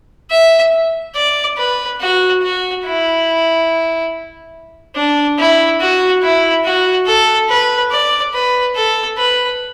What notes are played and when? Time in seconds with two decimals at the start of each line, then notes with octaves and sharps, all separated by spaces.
0.31 E5
1.15 D5
1.58 B4
2.01 F#4
2.42 F#4
2.85 E4
4.96 D4
5.38 E4
5.81 F#4
6.22 E4
6.64 F#4
7.06 A4
7.49 B4
7.92 D5
8.34 B4
8.75 A4
9.17 B4